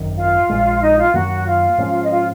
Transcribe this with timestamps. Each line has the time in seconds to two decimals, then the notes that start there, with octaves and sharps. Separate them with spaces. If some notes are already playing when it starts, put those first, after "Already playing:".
Already playing: G#1 F#2 D#3
0.17 F4 F5
0.49 A#1 A#2 G#3
0.82 D#4 D#5
0.98 F4 F5
1.14 F#2 D#3 F#3 A#3 F#4 F#5
1.40 F#5
1.46 F4 F5
1.78 G#2 F3 A#3 C#4
2.05 D#5
2.10 F4 F5